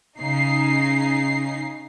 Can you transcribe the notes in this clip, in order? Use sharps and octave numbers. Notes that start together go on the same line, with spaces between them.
C#3 D#4 C7